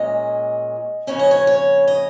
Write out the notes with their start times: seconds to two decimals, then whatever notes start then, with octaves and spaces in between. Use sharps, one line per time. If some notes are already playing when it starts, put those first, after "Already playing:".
Already playing: A#2 G#3 C#4 D#5
1.07 F2 C#3 A#3 C#4 C#5
1.19 D#5
1.31 C#5
1.47 C#5
1.87 D#5